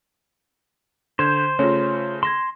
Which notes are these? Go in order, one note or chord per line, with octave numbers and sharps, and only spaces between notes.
D3 C5 G6 G#6 E7
C#3 A3 C#4 F4 C#5
C6 G#6 A#6 E7